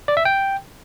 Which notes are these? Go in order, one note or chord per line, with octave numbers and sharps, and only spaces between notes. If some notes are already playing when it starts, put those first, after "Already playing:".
D5
E5
G5